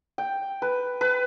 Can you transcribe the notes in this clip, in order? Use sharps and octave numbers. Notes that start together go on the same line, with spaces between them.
G5
B4
B4